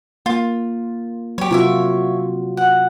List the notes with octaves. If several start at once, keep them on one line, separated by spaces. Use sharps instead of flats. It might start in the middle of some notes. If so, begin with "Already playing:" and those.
A#3 F4
F#3 G4 C#5
C3 F4 F#4 A#4 C#5 E5
F#5